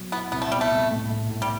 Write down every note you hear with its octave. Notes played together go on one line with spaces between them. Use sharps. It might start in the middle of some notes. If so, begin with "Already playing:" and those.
Already playing: B2 F#3
B3 E4
C2 B3
A3
B2 G3
A3
C2
A2
A2
A2
G3